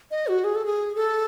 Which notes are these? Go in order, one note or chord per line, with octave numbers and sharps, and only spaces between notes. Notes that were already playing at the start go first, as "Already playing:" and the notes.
D#5
F#4
G#4
A4
G#4
A4